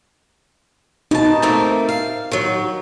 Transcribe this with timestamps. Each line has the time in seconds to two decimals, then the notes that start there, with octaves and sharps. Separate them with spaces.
1.11 B2 D#4 A5
1.42 A3 A#3 C4
1.89 F5
2.31 D#3 F#3